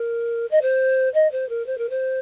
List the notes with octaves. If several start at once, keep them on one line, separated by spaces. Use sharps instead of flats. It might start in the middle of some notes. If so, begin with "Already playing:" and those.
Already playing: A#4
D#5
C5
D#5
C5
A#4
C5
A#4
C5